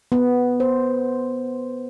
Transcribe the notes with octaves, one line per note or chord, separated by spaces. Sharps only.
B3
C5